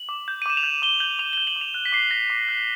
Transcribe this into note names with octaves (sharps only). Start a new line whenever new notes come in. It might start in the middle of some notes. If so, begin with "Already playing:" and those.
Already playing: F#7
D6
G6
D#7
D6 E7
F7
G6 F#7
D6 G7
G6 F#7
D6 F7
G6 G7
F#7
D6
F7
F#6
B6
D6 C7
F#6 A#6
D6
F#6